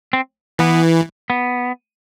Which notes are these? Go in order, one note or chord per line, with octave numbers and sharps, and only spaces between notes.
C4
E3 B3
B3